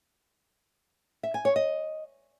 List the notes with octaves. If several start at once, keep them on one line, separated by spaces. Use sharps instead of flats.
E5
G#5
C#5
D#5